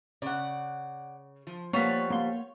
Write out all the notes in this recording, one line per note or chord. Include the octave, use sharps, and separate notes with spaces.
C#3 D5 F#5
F3
F3 G3 A#3 B3 C#5
A#3 C6